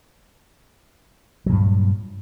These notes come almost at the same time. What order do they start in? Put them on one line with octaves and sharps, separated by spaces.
F#3 A#2 G2